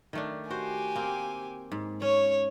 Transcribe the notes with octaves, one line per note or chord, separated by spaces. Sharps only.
D#3 A3 D4
F#4 G4 C5 G#5
A#3 C4
G#2
C#4 C#5